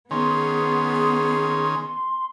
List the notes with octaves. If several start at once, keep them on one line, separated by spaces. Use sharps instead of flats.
D#3 B3 C#4 G#4 C6